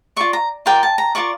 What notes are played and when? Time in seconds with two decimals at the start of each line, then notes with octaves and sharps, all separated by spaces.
0.16 F4 A#4 D5 C#6
0.33 A#5
0.66 F4 A#4 D5 G5
0.83 A5
0.98 A#5
1.15 F4 A#4 D5 C#6